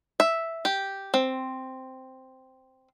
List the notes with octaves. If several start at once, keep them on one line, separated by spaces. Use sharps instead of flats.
E5
G4
C4